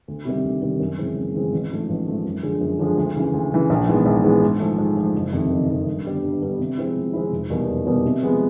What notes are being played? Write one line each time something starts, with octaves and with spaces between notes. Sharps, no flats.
D2
C3 D#3 G3
D2
C3 D#3 G3
F#2
C#3 E3 G#3 C4
F#2
C#3 E3 G#3 C4
A1
G#2 F3 A3
A1
G#2 F3 A3
F#2
D3 F3 G#3
F#2
D3 F3 G#3
D2
C#3 E3
D2
C#3 E3
A#1
G#2 E3 G#3 B3
A#1
G#2 E3 G#3 B3
G#2
F3 A3
G#2
F3 A3
F#1
F2 C3 D#3
F#1
F2 C3 D#3
G2
D3 G3 B3
G2
D3 G3 B3
C3
F3 G#3 C4 E4
C3
F3 G#3 C4 E4
F1
E2 B2 G3 A#3
F1
E2 B2 G3 A#3
C3
F3 G#3 B3